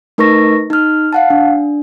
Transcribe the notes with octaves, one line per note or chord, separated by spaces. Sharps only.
A3 D#4 A#4 B4 C#6 A#6
D#4 F6
F5 F#5 A5
D4